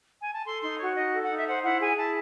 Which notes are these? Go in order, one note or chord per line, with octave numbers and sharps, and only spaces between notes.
G#5
A5
A4 C6
D#4 C6
F#4 C#5
D#4 D#5
A4
F#5
D#4
E5
C5 F#5
E4 F#5
G#4 G#5
E4 A5